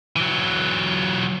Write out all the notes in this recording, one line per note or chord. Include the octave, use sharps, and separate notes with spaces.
E3 F#3